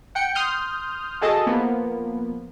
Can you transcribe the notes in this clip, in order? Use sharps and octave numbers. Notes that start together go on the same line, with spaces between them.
F#5 G5 C#7
C6 D#6 F6 G6
F#4 G#4 A4 D#5 A5
F3 A#3 B3